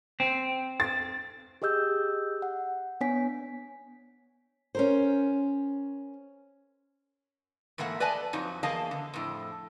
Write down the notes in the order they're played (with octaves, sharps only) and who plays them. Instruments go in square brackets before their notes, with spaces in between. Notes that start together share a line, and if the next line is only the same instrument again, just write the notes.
[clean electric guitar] C4
[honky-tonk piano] A6
[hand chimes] G4 G#4 D#5 E6 G6
F#5
B3 D4 C#5 G#5 B6
[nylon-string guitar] C#4 A#4 C5
[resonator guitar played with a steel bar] G#2 E3 A3 A#3 F#5
B4 D5 D#5 G#5 A5
F2 F#3 D#4
E2 A#3 G#4 D#5 F5 A5
D3
F2 A2